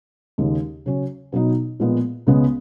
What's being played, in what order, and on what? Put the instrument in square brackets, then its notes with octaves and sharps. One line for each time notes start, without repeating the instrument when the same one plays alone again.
[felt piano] D#2 C#3 G#3 D#4
C#3 F#3 C#4
B2 F#3 B3 D#4
A#2 F3 G#3 B3
C#2 C#3 G#3 B3